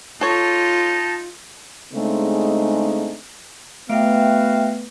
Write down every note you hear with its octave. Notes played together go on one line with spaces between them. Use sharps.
D#4 F4 A4 C#5 A5
C#3 G#3 A3 C4 D4 D#4
A3 B3 F#4 E5 F5 G5 D7